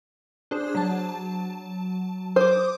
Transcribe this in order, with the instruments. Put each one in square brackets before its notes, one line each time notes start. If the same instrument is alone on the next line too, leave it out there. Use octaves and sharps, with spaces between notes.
[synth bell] D4 G#4 C5
F#3 A5
[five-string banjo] C5 [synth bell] D6 D#6